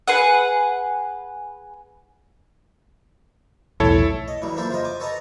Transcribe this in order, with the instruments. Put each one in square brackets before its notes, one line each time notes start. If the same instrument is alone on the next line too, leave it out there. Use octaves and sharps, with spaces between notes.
[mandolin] G#4 B4 F#5
[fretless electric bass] B1 E2 A2 [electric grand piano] E4 A4 C#5
[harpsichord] D#5
A2 E3 F#3 G3
F3 A#3 D4 E4 A4 C5
C#3 F3 F4 C5 D#5
G#5 D6
F#4 A4 B4 D#5 A5 A#5